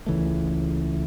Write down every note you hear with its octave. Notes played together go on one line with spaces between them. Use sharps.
C#2 C#3 E3 A3